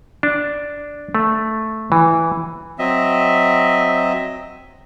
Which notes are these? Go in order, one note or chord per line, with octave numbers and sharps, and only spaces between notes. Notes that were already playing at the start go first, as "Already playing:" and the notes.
D4
A3
E3
F#3 C4 D#5 E5